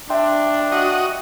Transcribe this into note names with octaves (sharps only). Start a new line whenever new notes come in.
D4 E5 G5 C6
F#4 D#5